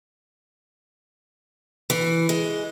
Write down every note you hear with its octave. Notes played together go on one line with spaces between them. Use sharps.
E3
G#3